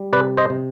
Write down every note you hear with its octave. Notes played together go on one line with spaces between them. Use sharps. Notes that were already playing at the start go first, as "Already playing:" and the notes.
Already playing: G3
C3 B4 D5
C5 D#5
C3